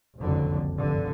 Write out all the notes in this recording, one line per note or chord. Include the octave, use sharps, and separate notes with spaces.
F#1 C2 F2 D3 F#3
F1 G2 D3